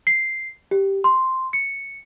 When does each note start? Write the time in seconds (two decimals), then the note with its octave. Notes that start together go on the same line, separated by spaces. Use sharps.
0.07 C7
0.71 G4
1.04 C6
1.53 C#7